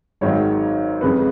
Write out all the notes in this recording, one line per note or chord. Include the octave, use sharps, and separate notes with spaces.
G#1 G#2 D#3 F#3 C#5
F2 C#3 G#3 B4